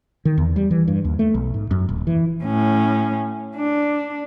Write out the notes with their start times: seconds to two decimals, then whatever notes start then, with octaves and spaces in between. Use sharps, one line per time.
0.25 D#3
0.38 E2
0.56 G3
0.71 E3
0.88 G2
1.05 D#2
1.19 A3
1.34 B1
1.54 G#2
1.71 F#2
1.89 D#1
2.07 E3
2.44 A2 C#4
3.56 D4